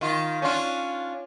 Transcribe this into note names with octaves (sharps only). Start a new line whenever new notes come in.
D#3 F4
C#4 D4 F4